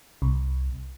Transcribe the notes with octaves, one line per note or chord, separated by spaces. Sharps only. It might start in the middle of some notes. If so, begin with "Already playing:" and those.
C2